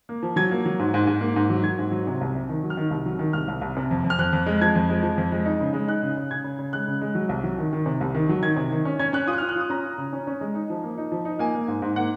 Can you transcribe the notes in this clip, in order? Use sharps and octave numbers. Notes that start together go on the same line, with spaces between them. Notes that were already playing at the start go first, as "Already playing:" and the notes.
A#3
F3
F#3 G#6
A#3
F#3
G#2
G#2
G#2
A#3
G#2
F#3
F#3 G#6
G#2
F#3
C3
C2
C3
D#3
F#3
F6
D#3
C2
F#3
D#3
C2 F6
C2
C2
C3
F2
F2
F6
F2 F#6
F2
G#3
F3 G#6
F2
G#3
F3
F2
G#3
D#4
C#3
G#3
D#4 F#6
C#3
C#3
C#3 G#6
C#3
C#3
G#3 F#6
C#3
G#3
F#3
C2
F#3
D#3
D#3
C3
C2
D#3
F#3
D#3 G#6
C3
D#3
C#4
C#4 G#6
C#4 F#6
F4 D#6
F#6
F6
F4
F#6
F4 D#6
C#4 A#5
F4
C#3
C#4
C#4
G#3
D#4
F3
A#3
D#4
F3
D#4
A#3 G#5
A#3
G#2
G#2
A#3 F#5